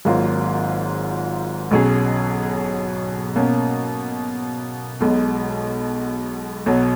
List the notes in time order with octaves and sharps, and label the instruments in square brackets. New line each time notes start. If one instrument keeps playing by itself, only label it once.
[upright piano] G#1 G#2 F#3 A#3 F4
B1 B2 F#3 C#4 G#4
B2 A#3 C#4
B1 B2 G#3
B1 B2 F#3